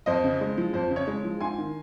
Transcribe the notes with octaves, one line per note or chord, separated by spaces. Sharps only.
F2 C5 D#5
C#3
G#3
F3
F2 C5
C#3
C#5
G#3
F3
G#2 G#5 C6
D#3